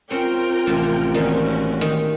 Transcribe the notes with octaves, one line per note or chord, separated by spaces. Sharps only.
C4 C#4 F4 A#4 G5
A1 C3 F3
D#3 G3 A#3 C4 C#4 F#4
D#3